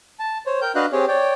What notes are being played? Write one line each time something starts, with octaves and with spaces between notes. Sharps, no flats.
A5
C5 C#5
A#4 G5 G6
D4 F#4 B4 D#5 F5 F#6
C4 G4 G#4 C#5
C#5 D5 G5